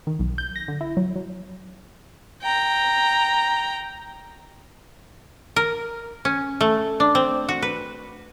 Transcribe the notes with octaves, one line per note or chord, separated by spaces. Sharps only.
D#3
B1
G6
A#6
D3
E4
F#3
F#3
G5 A#5
A#4
C#4
A3
D4
C4
F#4
B4